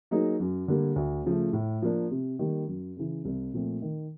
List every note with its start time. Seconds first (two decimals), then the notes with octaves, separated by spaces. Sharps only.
0.11 F#3 A#3 D#4 G#4
0.40 F#2
0.68 D3 G3 A#3
0.96 D2
1.24 C#3 F3 A3
1.53 A2
1.82 F3 A#3 D4
2.11 C3
2.39 D#3 G3 A#3
2.68 F#2
2.97 C#3 E3
3.25 C2
3.53 A#2 F3 A3 C4
3.82 D#3